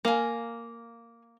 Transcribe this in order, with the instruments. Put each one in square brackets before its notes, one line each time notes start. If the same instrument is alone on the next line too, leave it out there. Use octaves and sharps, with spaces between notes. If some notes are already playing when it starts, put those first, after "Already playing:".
[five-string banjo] A#3 [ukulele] F5 G#5